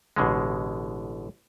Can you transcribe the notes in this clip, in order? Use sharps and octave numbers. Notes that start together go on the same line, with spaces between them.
A1 B2 D3 G#3